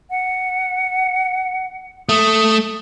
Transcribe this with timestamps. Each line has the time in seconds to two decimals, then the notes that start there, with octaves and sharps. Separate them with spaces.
0.10 F#5
2.09 A3 D#6